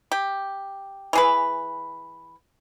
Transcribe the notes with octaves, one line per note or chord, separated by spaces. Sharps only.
G4
E3 G#4 B4